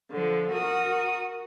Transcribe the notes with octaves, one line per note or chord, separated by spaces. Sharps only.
D3 F3
F#4 A#4 D#6